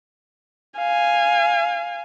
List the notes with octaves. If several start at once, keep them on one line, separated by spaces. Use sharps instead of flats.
F5 G#5